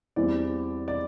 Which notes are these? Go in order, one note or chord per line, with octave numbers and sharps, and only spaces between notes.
E2 E3 G3 C4 D5
D5